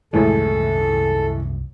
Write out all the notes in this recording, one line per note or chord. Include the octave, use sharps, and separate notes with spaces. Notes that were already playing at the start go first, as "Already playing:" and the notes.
C2 F#2 A2 D#3 E3 G#3 A4